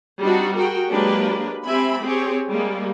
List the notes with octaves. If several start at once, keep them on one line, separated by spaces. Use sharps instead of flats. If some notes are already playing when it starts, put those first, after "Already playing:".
G3 C4 D4 D#4 F#4
F#4 G#4 A#4 G5
F#3 G#3 A#3 D4 G4 B4
C4 G4 E5 G#5 B5
C4 G4 G#4 C#5
G3 G#3 A#3